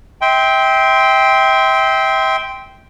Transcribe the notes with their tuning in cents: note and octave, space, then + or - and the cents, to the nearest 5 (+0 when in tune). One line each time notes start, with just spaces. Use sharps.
E5 -35 G5 +0 C6 -10